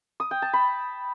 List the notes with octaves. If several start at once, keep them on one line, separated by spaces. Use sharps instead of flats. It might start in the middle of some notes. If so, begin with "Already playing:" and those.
D#6
G5
A5
B5